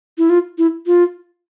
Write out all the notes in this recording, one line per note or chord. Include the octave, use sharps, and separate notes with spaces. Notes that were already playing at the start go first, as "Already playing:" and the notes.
E4
F4
E4
F4